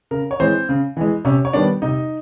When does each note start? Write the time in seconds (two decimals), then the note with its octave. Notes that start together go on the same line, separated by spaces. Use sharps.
0.11 C#3 A#4
0.31 C#5
0.40 E3 G#3 C4 C5
0.69 C#3
0.97 E3 G#3
1.25 C3 C#4 C#5
1.45 C#5
1.53 D#3 G3 B3 D4 D5
1.82 C3 D#4 D#5